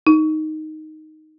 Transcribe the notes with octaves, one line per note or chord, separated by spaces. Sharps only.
D#4